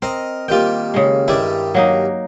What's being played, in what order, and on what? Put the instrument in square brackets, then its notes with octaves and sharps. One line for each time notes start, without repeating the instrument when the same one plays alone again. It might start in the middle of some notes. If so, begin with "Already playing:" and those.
[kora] C4 [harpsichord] A#4 D#5
[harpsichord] D#3 G3 A#3 [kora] F4 G5
[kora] C#3 G#3
[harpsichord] G2 D#3 G3 [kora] E4 D5
[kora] F#3 A#3 D#4